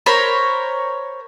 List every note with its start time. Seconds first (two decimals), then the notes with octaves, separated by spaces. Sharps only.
0.06 A#4 C5 C#5 B5